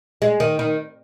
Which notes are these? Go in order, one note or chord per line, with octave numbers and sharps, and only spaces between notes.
G#3
D#3
D#3